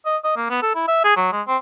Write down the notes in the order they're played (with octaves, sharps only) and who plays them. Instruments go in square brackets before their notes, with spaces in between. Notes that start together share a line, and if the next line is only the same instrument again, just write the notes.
[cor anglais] D#5
D#5
A#3
B3
A4
E4
E5
G#4
F#3
G#3
C4